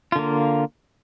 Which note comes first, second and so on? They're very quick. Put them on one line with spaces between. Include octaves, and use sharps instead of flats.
F4 D3 A#3